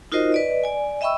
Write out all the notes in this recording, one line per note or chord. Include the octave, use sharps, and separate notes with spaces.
D#4 F4 F#4 A#4 C5 D#5
B4 D5 D#5
D5 G#5
D#5 E5 G5 B5 C#6 E6